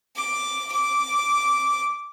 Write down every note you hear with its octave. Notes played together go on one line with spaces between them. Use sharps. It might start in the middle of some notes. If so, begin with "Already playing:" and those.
D6
D6